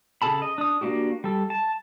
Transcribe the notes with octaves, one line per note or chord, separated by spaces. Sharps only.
C#3 G#4 A4 A5 B5
D#5
D4 D#6
A#3 C#4 D4 F#4 G4
G3 A4
A5